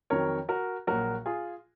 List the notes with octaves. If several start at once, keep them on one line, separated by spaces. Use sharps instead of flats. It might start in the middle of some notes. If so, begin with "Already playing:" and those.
F2 D#3 F#3 A#4 C#5
F#4 A#4
A#1 A#2 F#3 F#4 A#4
F4 G#4